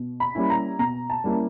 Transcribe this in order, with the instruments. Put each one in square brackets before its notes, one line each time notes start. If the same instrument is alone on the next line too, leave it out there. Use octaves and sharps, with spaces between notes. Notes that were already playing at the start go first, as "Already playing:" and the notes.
Already playing: [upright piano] B2
B5
G3 A#3 C#4 E4
A#5
B2 A#5
A5
G3 A#3 C#4 E4